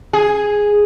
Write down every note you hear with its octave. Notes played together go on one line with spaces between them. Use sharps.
G#4